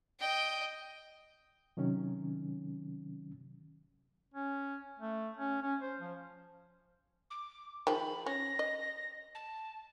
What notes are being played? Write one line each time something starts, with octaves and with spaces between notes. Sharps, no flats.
D#5 G5
C3 D#3 F#3 C#4
C#4
A3
C#4
C#4
C5
F3
D6
D#3 F3 G#4 B5
C#4 A#6
D#5
A5